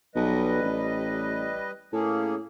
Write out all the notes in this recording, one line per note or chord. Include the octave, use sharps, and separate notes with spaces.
B1 G3 B4 D#5
A1
A2 A#3 C#4 G#4